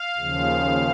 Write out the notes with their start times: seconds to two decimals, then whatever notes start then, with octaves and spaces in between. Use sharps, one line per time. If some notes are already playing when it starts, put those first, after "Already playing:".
Already playing: F5
0.18 D#2 C#3 F3